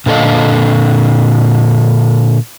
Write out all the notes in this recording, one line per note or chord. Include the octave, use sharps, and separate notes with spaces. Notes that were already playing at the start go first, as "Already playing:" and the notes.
A#2 D3 A4 D#5 F5